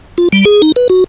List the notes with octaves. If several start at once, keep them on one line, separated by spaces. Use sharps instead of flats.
F4
G3
G#4
D#4
B4
F#4